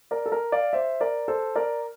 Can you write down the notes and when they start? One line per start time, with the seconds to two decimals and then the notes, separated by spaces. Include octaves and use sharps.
0.11 A#4 D5
0.26 A4
0.32 A#4
0.52 D5 F5
0.73 C5 E5
1.01 A#4 D5
1.28 A4 C5
1.56 A#4 D5